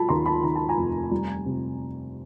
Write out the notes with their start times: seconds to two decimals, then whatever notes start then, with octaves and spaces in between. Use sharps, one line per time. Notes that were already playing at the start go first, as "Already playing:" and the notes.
Already playing: F#3 A5 B5
0.09 D#2 A#5 C6
0.26 A5 B5
0.43 D#3 A#5
0.56 A5
0.69 G#5 A#5
0.77 F1
1.11 G3
1.46 C3